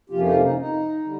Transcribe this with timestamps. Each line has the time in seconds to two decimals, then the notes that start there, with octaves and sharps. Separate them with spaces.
0.10 F2 C3 F3 A#3 C#4 F4 G4
0.25 D#4 F4
0.41 D#4
0.57 D#4
1.03 D3 G3